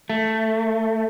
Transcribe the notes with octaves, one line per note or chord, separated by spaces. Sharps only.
A3